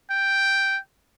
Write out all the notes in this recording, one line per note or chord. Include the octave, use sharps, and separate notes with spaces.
G5